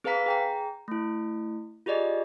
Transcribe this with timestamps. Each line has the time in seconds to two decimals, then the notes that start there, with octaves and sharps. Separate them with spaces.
0.04 C4 G#4 B4 F5 A#5 B6
0.26 G#4 G5 A#5
0.88 A3 E4
1.86 F4 G4 G#4 D5 D#5